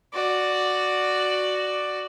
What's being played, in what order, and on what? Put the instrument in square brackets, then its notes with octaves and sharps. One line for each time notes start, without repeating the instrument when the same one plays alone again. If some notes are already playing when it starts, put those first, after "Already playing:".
[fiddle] F#4 D5